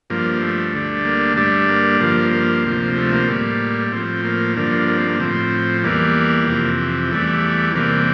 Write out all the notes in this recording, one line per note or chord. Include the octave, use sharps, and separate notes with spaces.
G2 F3 A#3
A3
D2 D3 G3
A#3
G2 D3 G3 A3
A#3
G2 F3 A#3
A#3
D2 C3 F3
A3
A#3
A2 G3
A2 F3 C4
A#3
G2 D3 F3 A#3
A#3
C4
A#3
A2 F3 C4
E2 E3 G3 A#3
F2 C3 E3
E2 E3 G3 A3
E2 C3 E3 G3 A#3